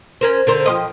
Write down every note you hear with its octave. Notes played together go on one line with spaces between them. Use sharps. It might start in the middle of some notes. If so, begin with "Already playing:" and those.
C#4 A#4 C5
D3 A#4 C5
F3 G4 D#5